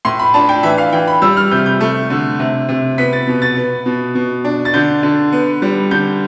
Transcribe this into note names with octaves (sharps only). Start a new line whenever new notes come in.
A2 C6
B5
D4 A5
G5
E3 E5
F5
E3 G5
B5
G3 E6
F6
C3 G6
G6
A3
D3
C3
C3
B3 B6
A6
B2
A6
B3
B2
B2
D4
A6
D3 G6
D3
B3
G3
D3 G6